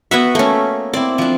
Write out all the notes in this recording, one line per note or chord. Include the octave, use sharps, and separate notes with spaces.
B3 F#4 E5 F#5
A3 A#3 C#4
C4 E4 D5
F3 D4